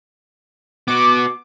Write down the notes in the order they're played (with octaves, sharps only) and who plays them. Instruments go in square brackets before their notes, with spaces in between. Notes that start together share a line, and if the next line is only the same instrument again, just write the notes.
[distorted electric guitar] B3 F#4 [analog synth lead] D6